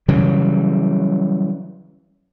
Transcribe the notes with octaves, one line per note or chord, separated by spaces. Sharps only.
C#3 E3 F#3 G3